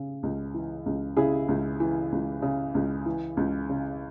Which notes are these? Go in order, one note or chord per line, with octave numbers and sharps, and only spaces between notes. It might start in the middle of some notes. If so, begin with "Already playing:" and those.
Already playing: C#3
C#2
E3
C#2
C#3 E4 G#4
C#2
E3
C#2
C#3
C#2
E3
C#2
C#3